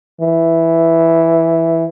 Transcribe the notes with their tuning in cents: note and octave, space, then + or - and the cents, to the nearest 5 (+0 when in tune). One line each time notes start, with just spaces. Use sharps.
E3 +0